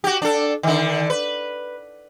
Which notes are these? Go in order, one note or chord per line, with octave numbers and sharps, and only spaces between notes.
F#4 G4
D4 A4
D3 D#3
B4